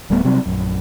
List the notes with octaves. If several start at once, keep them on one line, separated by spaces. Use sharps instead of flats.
D1 G3 A3 B3
C3 F#3 G3 C4
A#1 F#2